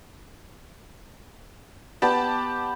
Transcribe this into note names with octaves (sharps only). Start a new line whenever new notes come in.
B3 G4 D5 A5